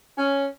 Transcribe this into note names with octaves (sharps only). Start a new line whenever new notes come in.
C#4